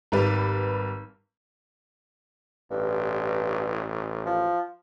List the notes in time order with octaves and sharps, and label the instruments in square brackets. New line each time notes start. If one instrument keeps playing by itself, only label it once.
[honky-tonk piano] G#1 G3 B4
[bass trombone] A1 [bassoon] G2
[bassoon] F3